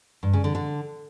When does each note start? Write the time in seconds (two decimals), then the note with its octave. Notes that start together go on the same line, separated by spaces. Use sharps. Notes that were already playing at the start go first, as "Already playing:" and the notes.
0.23 G2
0.33 C#3
0.44 D3
0.55 D3